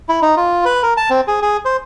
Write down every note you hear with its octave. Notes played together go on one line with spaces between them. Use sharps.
E4
D#4
F4
B4
A#4
A5
C4
G#4
G#4
C5